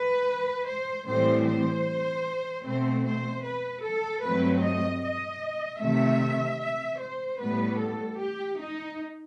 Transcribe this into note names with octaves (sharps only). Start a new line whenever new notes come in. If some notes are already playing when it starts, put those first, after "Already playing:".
Already playing: B4
C5
A2 E3 G3 C4 C5
C5
B2 A3 C4 C5
C5
B4
A4
G2 F#3 A3 C4 B4
D#5
D#5
C3 D#3 A3 E5
E5
C5
A2 G3 B3 B4
A4
G4
D#4